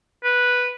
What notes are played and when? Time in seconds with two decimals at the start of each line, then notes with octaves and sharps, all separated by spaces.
0.24 B4